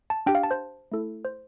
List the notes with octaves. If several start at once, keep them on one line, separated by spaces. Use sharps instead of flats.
A5
D4 G4 G5
F5
A5
C5
A3 E4 A4
C5